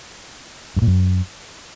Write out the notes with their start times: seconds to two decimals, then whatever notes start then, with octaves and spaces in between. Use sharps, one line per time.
0.76 G2
0.82 A#2
0.87 F#2